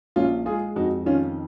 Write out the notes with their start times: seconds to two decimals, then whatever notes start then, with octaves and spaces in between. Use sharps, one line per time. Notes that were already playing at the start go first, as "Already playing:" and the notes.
0.16 A#1 C#4 F4
0.46 G#3 F4 G#4
0.76 F2 D#4 F#4
1.06 D#3 C#4 F4